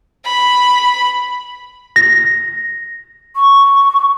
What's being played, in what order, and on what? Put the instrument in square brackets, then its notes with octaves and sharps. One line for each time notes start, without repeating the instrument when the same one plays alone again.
[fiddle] B5
[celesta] A#6
[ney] C#6